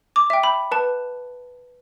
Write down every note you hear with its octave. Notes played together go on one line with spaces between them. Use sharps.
D6
E5 G5
B5
B4 A5